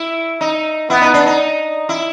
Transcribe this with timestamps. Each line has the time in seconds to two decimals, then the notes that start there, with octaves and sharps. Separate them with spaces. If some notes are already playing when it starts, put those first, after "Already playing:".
Already playing: E4
0.41 D#4
0.90 B3 E4
1.01 D#4
1.14 D4
1.26 D#4
1.89 E4